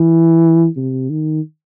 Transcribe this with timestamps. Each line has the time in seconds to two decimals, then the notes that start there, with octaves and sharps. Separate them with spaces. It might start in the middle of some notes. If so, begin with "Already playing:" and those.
Already playing: E3
0.76 C3
1.10 D#3